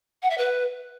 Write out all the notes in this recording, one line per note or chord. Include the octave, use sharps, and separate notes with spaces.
F#5
E5
B4